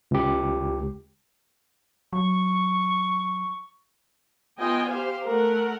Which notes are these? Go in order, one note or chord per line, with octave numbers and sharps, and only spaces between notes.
C#2 G4
F#3 C#6
B3 F4 D#5 G5 G#5
G4 C5 F5
A3 A#4 F#5